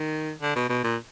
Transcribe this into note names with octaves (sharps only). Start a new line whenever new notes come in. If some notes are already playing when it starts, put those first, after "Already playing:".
Already playing: D#3
D3
B2
B2
A#2